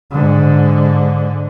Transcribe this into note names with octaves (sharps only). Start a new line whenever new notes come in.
G#2 D3